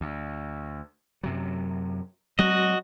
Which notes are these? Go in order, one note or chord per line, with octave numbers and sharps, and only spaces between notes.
D2
F#2 C3 F#3
F#3 G#3 C4 F#4 D#5